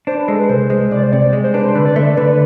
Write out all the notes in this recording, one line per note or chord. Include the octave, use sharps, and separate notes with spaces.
D4 C5
B4
G#3 A4
B4
C2 C5
G#3
C2 D5
C5
C3 D5
G#3
C5
D4 B4
C5
D3 B4
D5
A3 E5
D5
D3 B4